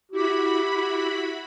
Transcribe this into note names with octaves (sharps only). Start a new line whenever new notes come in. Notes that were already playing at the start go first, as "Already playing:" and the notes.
E4 F#4 G4 B5